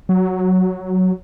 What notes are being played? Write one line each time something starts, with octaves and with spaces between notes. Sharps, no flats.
F#3